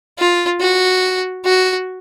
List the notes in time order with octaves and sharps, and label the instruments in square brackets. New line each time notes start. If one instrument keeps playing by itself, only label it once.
[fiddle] F4
F#4
F#4